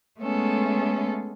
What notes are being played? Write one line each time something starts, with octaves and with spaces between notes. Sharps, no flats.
G#3 A3 B3 C#4 A4